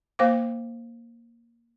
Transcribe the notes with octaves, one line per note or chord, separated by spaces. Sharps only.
A#3 C5 F5 D6